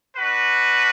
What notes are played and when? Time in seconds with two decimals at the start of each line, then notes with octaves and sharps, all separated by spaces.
0.16 D4 F#4 B4